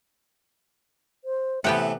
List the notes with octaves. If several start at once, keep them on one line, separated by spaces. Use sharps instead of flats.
C5
A2 C3 E3 B3 G4 E5 F#5